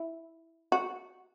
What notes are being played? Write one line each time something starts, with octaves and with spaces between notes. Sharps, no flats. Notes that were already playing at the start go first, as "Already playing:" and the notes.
Already playing: E4
F#4